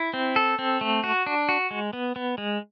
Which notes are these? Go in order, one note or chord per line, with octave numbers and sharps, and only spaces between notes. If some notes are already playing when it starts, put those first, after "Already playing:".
Already playing: E4
C4
A4
C4
A3
F#4
D4
F#4
G#3
B3
B3
G#3